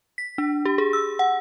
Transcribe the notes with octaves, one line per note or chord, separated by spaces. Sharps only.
B6
D4
G4
G#4
E6
F#5